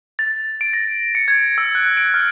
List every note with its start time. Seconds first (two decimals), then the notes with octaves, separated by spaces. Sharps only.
0.19 A6
0.61 D7
0.73 A#6
1.15 C#7
1.28 G#6
1.58 E6
1.75 F#6
1.97 D7
2.14 F6